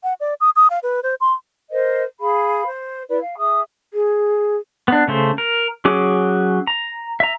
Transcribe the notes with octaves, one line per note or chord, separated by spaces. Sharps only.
F#5
D5
D#6
D#6
F5
B4
C5
C6
A#4 C5 D#5
G#4 F5 B5
C5
E4 B4 D5
F5
G#4 E5 D#6
G#4
B3 D4
C#3 A3 C5
A#4
F#3 C#4 G#4 D6
A#5
E5 A#5